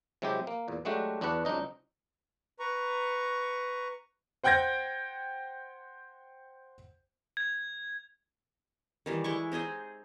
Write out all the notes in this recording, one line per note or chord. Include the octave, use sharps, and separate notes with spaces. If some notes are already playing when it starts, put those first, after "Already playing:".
C3 F#3 G#3 E4 G4
A#3
E2 A#2
F#3 G#3 A3 D4 F#4 G4
E2 D4 F#4 B4 F#5
C#2 F#3 D4 D#4 D#5
B4 A#5 C#6
C5 F#5 G5 G6 G#6 A#6
G#6
D#3 E3 G3
G#3 E4 C#6
C4 D#4 G#4 D#5